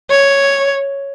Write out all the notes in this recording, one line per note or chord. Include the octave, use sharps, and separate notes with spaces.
C#5